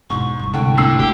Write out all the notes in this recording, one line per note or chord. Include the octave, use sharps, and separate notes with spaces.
E1 G#2 C#6
G2 E3
C2 G#2 D3 G5
A2 D3 E6 C7
D3 G4